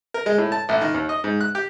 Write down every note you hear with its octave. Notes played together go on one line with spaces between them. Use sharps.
A#4
G#3
A2
A5
A1
D#3
D#2
D#5
G#2
F#6
G4